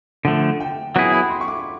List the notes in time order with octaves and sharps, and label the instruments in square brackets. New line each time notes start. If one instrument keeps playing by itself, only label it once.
[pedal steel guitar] D3 F3 A3 [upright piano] F#5
[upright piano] G5
[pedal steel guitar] F#3 B3 E4 G#4 [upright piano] F#5
[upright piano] B5
C6
C#6
D6